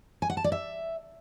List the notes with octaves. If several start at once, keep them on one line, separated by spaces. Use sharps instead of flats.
G#5
F#5
A5
D5
E5